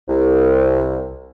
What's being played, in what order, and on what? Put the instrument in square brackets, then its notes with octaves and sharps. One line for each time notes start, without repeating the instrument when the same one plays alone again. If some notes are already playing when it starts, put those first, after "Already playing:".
[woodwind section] C2